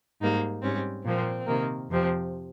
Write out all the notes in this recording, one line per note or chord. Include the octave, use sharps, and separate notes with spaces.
G#2 G3 A#3 D#4
G#2 G3 C4 C#4
A#2 F3 A#3 C4
C3 D#3 A#3
F2 C3 F3 C4